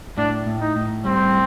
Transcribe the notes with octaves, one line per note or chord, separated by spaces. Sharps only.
A2 D4
A2
D#4
A2
G3 C4